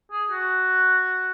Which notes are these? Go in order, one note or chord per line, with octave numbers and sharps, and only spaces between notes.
G#4
F#4